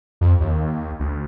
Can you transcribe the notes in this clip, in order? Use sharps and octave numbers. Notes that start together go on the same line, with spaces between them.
F2
D#2
D2